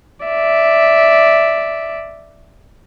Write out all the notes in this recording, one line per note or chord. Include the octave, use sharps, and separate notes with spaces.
D5 E5